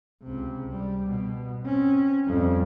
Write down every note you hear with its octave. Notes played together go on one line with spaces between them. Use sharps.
C#2 C3
G3
B2
C4 C#4
F2 G3